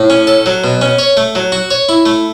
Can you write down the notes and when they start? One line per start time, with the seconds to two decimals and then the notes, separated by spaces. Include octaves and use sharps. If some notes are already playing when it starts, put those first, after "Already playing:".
Already playing: A2
0.10 C#4
0.27 A4
0.46 F#3
0.64 B2
0.81 C#4
0.99 C#5
1.17 A3
1.35 F#3
1.52 F#4
1.70 C#5
1.89 E4
2.06 A3